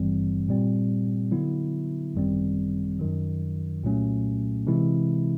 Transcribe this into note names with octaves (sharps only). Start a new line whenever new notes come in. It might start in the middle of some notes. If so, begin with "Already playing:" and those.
Already playing: G#1 G2 E3 G3 C4
A#2 G3 C4
D3 F#3 B3 E4
G#1 F#2 D#3 G3 C4
F#2 D#3 F#3
C2 A#2 F#3 A3 C#4
C3 E3 G#3 C4 E4